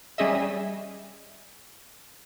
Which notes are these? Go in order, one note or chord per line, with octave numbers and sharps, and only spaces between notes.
G3 C#4 G#4 D#5 E5